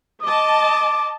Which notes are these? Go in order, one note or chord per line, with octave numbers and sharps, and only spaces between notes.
D#5 A5 D6